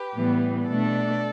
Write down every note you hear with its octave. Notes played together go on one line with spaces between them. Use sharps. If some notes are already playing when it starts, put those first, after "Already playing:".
Already playing: G4 B4
A2 E3 G3 B3
B2 A3 D4 A4 D5